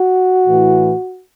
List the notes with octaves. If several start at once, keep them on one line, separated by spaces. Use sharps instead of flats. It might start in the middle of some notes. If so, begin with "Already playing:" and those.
Already playing: F#4
A2 E3